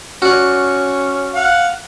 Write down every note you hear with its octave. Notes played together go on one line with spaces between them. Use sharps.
C#4 F#4 D5
F5 F#5